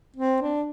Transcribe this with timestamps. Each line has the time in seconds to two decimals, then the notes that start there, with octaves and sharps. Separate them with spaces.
0.16 C4
0.42 D4